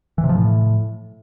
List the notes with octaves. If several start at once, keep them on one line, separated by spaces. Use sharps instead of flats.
E3
C3
F3
A2